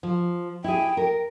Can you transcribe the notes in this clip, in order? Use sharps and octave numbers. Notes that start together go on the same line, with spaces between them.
F3
E4 G#4 G5
A#4